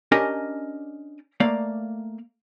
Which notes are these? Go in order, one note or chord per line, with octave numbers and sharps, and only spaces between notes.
C#4 D4 G4 A#4 D#5 G#5
A3 A#3 D5 F5